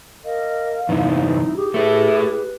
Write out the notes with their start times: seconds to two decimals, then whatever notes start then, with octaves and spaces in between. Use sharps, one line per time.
0.25 A#4 D#5 F5
0.89 E2 G2 C3 D#4 E4
1.56 G4 G#4
1.74 A3 E4 G#4 B4